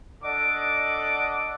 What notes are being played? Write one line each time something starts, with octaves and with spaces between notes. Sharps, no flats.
D4 A4 D5 D#5 F#5 D6